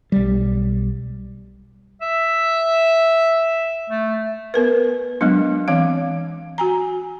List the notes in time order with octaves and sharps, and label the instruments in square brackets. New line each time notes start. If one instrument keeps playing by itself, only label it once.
[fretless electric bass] B1 G3
[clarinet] E5
A3
[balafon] B3 A#4 B4
F#3 G#3 B3 D4
E3 C4 F5
F#4 G#5 A#5